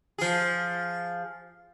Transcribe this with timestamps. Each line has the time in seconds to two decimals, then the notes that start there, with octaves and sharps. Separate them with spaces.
0.18 F3 G#4